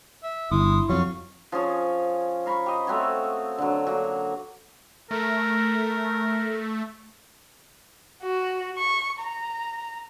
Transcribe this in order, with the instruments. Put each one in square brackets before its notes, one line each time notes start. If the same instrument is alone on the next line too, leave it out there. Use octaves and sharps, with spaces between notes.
[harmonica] E5
[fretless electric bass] G1 [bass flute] E4 [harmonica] C6 D#6
[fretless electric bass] F2 F#3 [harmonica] F5 C#6
[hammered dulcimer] F3 C#4 G#4 C#5
F5 A#5 B5 C#6
G4 D#5
A3 C4 F#4 C#5
D3 F#3
F#3 A#3
[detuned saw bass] A3 [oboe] A#4
[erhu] F#4
C#6
A#5